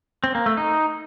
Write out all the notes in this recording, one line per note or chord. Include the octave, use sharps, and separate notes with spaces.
C4
A#3
A3
D#4